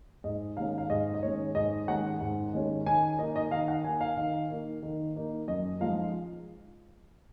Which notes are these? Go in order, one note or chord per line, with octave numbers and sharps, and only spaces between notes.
G#2 D#5
D#3 G#3 C#4 F5
F5
G#2 D#5
D#5
D#3 G#3 C#4 C#5
G#2 D#5
D#3 G#3 C#4 F#5
G#2
D#3 G#3 C#4
D#3 G#5
A#3 D#4 D#5
D#5
D#3 F5
F#5
A#3 D#4 G#5
F5
D#3
A#3 D#4
D#3
A#3 D#4
F#2 D#5
F3 G#3 D#4 F5